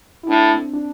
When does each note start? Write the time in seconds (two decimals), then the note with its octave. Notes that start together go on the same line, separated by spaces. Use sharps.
0.23 E4
0.28 A2 D4
0.54 C4
0.73 D4